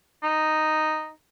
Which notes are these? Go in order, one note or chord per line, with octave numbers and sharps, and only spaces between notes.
D#4